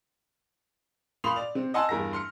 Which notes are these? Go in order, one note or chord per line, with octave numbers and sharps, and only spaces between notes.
A#2 F5 B5 C6 D#6 F7
D5 F7
C3 C4
D#5 F#5 G#5 A5 C6 E6
E2 G2 A#4 A#5 A#6
C6 F6 C#7